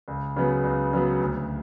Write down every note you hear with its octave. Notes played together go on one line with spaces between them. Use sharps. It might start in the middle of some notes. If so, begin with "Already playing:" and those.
C#2
C#3 F#3 B3
C#2
C#3 F#3 B3
D2